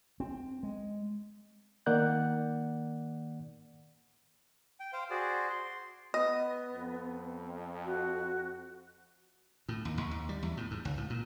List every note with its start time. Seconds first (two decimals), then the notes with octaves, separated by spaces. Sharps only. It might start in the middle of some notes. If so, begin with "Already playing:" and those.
0.20 C4
0.63 G#3
1.86 D#3 A#3 D5 F#5 F#6 G6
4.80 G5
4.93 C5 F5 G5
5.10 F#4 G#4 C5 D5
5.50 C6
6.14 B3 D#5
6.73 F2
7.85 F#4
9.69 A2
9.85 D#2
9.98 D#2
10.11 D#2
10.29 G3
10.43 E2
10.57 A2
10.71 G#2
10.85 C#2
10.97 A2
11.10 A#2